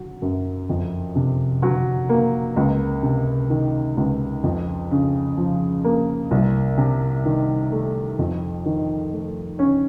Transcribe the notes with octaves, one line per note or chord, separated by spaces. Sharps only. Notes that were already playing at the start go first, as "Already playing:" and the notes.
Already playing: F#3
F#2
F2
C3
F#3
A#3
C#2
C3
D#3
C#2
F2
C#3
F3
A#3
C2
C3
D#3
A3
F2
D#3
A3
C#4